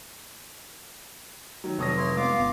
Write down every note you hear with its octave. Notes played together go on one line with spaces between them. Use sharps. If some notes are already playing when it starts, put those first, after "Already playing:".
D#3 F#3
F1 F#3 A4 C#5 D#6 A#6
E4 C#5 C6
G#3 B3 F4 F5 D6
G1 B3